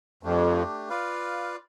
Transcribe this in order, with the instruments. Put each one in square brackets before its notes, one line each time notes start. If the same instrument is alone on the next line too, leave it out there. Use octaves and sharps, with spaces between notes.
[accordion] F2 [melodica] A3 D4 G4
[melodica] F4 B4 D5 F5